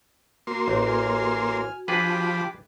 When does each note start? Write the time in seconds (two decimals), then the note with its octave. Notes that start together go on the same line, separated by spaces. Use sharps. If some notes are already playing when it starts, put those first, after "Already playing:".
0.47 A#3 F#4 C6
0.68 A1
0.87 G#5 F6
1.88 F3 D4 G4 G#4 B4 B5 D6